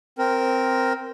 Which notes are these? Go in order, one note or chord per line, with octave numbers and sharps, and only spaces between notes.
C4 A#4